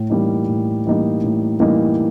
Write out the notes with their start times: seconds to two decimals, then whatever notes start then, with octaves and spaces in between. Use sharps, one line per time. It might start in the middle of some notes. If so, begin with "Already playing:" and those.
Already playing: A2
0.10 E3 G3 A#3 D#4
0.48 A2
0.86 E3 G3 A#3 D#4
1.24 A2
1.60 E3 G3 A#3 D#4